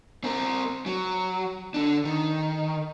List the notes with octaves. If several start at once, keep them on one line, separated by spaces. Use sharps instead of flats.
C4 A#4
F#3
D3 D4
D#3